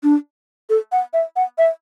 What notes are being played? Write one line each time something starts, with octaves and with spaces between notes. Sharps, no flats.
D4
A4
F#5
E5
F#5
E5